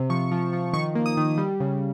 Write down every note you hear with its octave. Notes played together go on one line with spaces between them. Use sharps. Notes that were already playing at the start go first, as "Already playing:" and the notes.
Already playing: C3
F3 C#6
F3
F3
D#3 C#6
A#3
D#6
D#3
G3
C#3